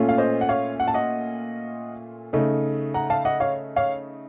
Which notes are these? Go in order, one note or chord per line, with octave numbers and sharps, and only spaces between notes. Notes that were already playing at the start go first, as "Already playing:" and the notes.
Already playing: A#2 A3 C#4 F4
F5
C5 D#5
F#5
C#5 F5
F#5
A5
D#5 F#5
C#3 A3 D#4
F#5 A#5
F5 A5
D#5 F#5
C#5 F5
C#5 F5